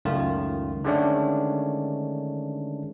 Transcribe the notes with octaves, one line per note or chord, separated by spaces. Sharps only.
C#2 F#2 D#3 A3 F4
D3 D#3 G#3 A3 C#4 D4